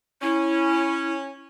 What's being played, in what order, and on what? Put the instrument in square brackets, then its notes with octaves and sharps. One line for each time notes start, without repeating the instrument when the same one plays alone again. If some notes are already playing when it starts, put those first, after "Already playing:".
[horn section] C#4 [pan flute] E4